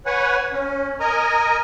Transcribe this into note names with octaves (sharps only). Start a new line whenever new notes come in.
B4 C#5 F#5 G#5
C#4
A#4 D#5 G#5 A#5